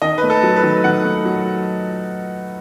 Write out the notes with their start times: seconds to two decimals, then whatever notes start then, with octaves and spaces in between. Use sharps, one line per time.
0.02 D#3 D#5
0.18 B4
0.23 A3
0.30 A4
0.43 F#3
0.56 B4
0.63 D#3
0.84 D#3 F#5
1.04 A3
1.25 F#3